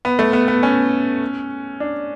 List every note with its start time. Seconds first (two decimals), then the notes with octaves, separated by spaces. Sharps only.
0.05 B3
0.19 A3
0.33 B3
0.48 B3
0.63 C#4
1.80 D4